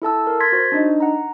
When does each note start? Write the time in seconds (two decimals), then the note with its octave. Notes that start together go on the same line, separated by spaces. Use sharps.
0.02 E4 A4 A5 E6
0.27 A#4
0.40 C6 G#6 A6 B6
0.52 F#4 C5
0.72 D4 D#4 D#5
1.00 F#5 A#5